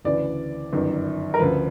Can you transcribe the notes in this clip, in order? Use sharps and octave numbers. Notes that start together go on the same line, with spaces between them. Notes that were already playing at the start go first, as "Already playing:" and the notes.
D2 C#3 E3 D5
G1 F#2 D#3
A#4
D2 C#3 F3 B4